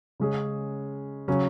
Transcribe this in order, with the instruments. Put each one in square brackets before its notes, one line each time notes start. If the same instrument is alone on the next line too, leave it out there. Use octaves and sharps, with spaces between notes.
[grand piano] C#3 G#3 C#4 G#4
C#3 F#3 C#4